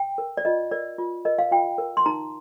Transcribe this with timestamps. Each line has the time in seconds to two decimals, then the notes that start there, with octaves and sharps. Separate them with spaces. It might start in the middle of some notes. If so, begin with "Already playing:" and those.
Already playing: G5
0.18 A#4
0.37 D5
0.45 F4 D#5
0.71 A#4 D5
0.98 F4
1.25 A#4 D#5
1.39 F5
1.51 F4 G5
1.78 A#4
1.97 C6
2.06 D#4 A#5